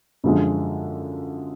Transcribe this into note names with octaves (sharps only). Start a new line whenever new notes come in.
F#2 D3 F3 G#3